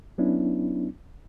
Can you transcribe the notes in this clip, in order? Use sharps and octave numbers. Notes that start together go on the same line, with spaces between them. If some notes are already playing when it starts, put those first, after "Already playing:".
F#3 B3 C#4 D4 E4